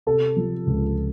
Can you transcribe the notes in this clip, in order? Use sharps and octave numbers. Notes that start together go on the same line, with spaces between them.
C3 A4
F3
C#2